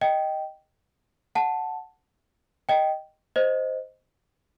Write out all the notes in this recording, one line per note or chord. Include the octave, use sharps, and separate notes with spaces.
D#5 G5
F#5 A5
D#5 G5
C5 D#5